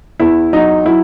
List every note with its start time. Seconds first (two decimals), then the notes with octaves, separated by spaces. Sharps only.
0.20 E2 E4
0.53 F#3 D#4
0.86 F#3 E4